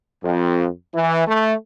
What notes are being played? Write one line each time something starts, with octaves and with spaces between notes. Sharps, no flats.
F2
E3
A3